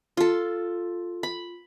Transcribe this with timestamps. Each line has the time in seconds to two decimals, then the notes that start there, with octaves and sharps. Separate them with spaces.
0.17 F4 A4
1.23 B5